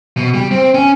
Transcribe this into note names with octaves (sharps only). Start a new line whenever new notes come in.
B2
G3
C4
C#4